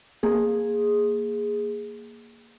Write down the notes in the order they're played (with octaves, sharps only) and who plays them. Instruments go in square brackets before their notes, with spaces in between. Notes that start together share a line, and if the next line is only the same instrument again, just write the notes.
[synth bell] A#3 G#4